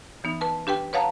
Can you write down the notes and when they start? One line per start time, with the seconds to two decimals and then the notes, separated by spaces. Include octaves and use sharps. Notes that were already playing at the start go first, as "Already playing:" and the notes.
0.24 E3 B3 D#4
0.41 B4 A5
0.67 D4 G4 B4 G5
0.93 B4 C#5 F5 F#5 A5 A#5